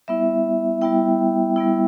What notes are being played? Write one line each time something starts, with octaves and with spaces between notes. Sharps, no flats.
G3 B3 E4 E5
G3 B3 E4 G5
G3 B3 E4